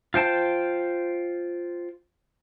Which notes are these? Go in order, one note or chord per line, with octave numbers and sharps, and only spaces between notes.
F4 C5 G5 A5